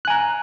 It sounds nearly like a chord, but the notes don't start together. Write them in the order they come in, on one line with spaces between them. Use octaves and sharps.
F#6 G#5 A#5